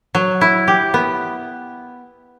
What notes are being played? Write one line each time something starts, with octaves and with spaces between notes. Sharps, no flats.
F#3
E4
G4
B3